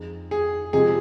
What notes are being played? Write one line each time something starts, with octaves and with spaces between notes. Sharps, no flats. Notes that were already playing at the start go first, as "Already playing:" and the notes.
Already playing: F2 G#3 D#4
G#4
C3 F3 G#3 G#4